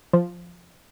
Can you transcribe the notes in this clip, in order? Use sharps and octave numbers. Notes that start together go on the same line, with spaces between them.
F3